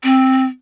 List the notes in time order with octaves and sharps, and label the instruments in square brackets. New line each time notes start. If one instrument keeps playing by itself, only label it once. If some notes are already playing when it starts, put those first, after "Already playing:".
[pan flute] C4